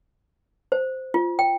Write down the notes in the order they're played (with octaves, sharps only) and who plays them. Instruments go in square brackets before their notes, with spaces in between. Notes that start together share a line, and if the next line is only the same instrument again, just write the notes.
[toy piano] C5
F4
G5